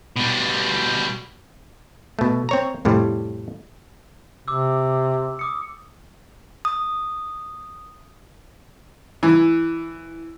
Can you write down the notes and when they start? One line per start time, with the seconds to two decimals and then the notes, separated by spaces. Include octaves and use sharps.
0.16 B2 G3
2.19 B2 A3
2.49 C4 C#5 A#5
2.85 F2 A2 C3 G3
4.48 C3 D6 E6
5.39 D6 D#6 C#7
6.65 D#6
9.23 E3